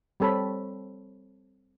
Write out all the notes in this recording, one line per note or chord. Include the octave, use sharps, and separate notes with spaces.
G3 C4 A4 C#5 B5